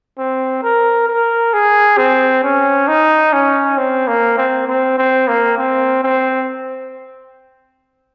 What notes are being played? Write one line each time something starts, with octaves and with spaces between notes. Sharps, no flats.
C4
A#4
A#4
G#4
C4
C#4
D#4
C#4
C4
A#3
C4
C4
C4
A#3
C4
C4